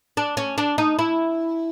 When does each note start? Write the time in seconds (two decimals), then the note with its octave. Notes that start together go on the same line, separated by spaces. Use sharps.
0.17 D4
0.37 C#4
0.58 D4
0.78 D#4
0.99 E4